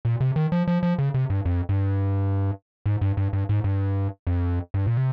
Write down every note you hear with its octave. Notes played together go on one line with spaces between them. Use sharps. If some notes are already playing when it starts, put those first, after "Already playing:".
A#2
C3
D#3
F3
F3
F3
C#3
C3
G2
F2
G2
G#2
G2
G2
G2
G#2
G2
F2
G2
A#2
C3